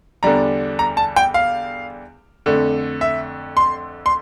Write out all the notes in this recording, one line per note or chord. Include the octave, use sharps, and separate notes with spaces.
E2 D3 G3 D4 A#5
A#5
A5
G5
F5
F2 D3 A3
E5
C6
C6